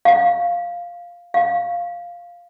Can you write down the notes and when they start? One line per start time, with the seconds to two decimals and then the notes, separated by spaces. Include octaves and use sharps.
0.05 F5
1.34 F5